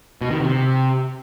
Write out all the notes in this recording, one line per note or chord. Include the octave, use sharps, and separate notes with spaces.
B2
D#3
C3